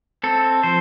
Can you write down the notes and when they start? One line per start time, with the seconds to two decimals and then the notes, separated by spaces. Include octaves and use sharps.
0.23 C4 A4
0.63 F3 C5